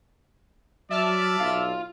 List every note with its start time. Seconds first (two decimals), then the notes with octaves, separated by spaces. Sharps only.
0.91 F#3 D5 E5 A5 F6
1.40 B1 F4 F5